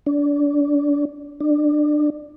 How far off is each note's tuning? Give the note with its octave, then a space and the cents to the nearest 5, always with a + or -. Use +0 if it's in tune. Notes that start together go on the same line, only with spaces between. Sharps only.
D4 -25
D4 +25